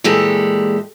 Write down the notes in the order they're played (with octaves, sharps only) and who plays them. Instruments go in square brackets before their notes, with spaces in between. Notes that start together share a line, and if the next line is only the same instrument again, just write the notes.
[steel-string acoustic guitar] A#2 E3 G#3 G4 A4